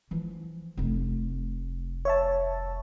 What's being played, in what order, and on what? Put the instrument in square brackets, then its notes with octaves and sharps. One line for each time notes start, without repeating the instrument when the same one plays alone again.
[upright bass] E3 F3
F1 A3
[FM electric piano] C#5 E5 A5